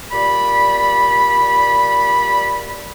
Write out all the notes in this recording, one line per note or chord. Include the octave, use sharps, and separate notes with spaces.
A#2 G3 D5 B5